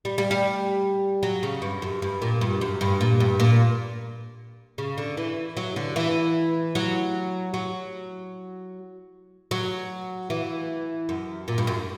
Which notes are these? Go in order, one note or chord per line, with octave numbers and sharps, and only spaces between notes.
G3
G3
G3
F#3
C#3
G2
F#2
G2
A#2
G2
F#2
G2
A#2
G2
A#2
C#3
D3
E3
F#3
D3
E3
F#3
F#3
F#3
E3
F#2
A#2
G2
F#2